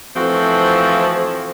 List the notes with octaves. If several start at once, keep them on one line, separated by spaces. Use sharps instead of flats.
E3 F3 A3 C4 F#4